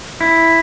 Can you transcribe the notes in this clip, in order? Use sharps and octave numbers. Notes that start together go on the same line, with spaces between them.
E4